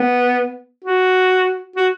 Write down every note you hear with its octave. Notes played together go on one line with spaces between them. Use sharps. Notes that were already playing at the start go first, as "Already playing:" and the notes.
Already playing: B3
F#4
F#4